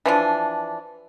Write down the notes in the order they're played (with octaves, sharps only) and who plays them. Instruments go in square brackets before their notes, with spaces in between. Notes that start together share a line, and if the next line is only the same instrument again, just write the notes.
[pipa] E3 F3 D4